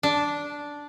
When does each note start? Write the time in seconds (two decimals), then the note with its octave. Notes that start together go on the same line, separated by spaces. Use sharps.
0.03 D4